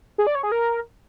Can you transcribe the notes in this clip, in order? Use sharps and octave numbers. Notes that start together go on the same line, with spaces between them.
G#4
D5
C#5
G#4
A#4